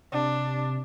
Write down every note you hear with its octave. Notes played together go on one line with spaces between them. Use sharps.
C3 D4